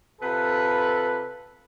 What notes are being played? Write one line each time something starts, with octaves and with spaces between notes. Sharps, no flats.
C3 F4 A4 B4